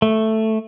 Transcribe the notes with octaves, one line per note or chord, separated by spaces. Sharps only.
A3